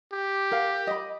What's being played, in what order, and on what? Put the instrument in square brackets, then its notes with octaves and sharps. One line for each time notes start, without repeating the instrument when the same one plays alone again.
[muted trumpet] G4
[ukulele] A#4 F5
D#5 B5